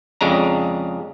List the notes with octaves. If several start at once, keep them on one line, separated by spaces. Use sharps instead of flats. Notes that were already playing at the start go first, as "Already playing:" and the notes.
F2 C#3 G#3 D4 A#5